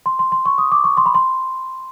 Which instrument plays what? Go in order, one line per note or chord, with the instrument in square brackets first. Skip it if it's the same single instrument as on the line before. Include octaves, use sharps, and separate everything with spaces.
[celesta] C6
C6
C6
C#6
D#6
D6
C#6
C6
B5
C6